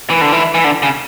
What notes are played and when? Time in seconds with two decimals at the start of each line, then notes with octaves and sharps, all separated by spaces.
0.10 E3
0.21 D3
0.32 E3
0.54 E3
0.64 D3
0.83 C#3